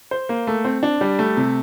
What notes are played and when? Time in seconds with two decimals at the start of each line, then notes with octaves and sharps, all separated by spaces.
0.11 C5
0.29 A#3
0.47 A3
0.65 C4
0.83 D4
1.01 G3
1.19 A3
1.37 C3